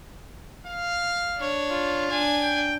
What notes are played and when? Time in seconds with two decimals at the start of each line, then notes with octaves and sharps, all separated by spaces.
0.67 F5
1.38 D4 C#5
1.71 F4
2.10 D4 G#5
2.41 G5